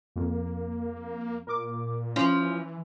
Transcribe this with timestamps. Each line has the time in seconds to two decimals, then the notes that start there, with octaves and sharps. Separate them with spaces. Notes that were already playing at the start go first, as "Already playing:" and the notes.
0.16 F2 A#3
1.47 A#2 A#4 D6
2.16 E3 F3 C#4